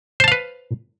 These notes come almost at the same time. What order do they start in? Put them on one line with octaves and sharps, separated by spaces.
C5 A5 F5 B4